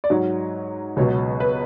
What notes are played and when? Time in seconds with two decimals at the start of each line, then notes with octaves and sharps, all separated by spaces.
0.04 D5
0.10 G#2 F#3 C#5
0.96 C#2 B2 F#3 C#5
1.40 B4